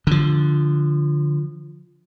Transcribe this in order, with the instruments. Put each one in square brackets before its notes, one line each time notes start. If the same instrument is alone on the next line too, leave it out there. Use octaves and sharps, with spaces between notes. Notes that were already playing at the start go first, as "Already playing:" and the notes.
[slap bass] D3 F3